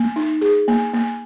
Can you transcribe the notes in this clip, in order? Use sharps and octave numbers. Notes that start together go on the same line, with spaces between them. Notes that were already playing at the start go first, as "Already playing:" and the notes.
Already playing: A#3
D#4
G#4
A#3
A#3